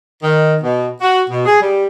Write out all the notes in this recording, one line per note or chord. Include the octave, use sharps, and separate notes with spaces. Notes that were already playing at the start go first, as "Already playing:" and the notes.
D#3
B2
F#4
B2
G#4
G3